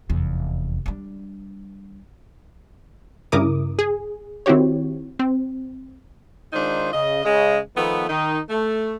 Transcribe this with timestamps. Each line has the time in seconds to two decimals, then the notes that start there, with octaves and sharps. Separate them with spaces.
0.10 F1 E2
0.86 G3 D4
3.32 G2 C#3 E4 A#4 D6 D#6
3.79 G#4
4.46 D#3 C4 E4 F#4 G4 C#5
5.19 C4
6.53 D#3 G#3 D4 D#4 F4 C5
6.92 C#3 D#5
7.25 C#3 G#3 D#5
7.76 D#3 F3 A3 B3
8.09 D#3 D#4
8.49 A3